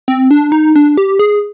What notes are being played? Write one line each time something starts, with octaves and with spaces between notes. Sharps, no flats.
C4
D4
D#4
D4
G4
G#4